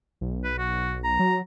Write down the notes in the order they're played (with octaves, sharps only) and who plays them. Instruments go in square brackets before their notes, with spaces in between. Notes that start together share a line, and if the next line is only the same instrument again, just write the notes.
[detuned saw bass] B1
[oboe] B4
F#4
A#5
[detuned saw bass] F#3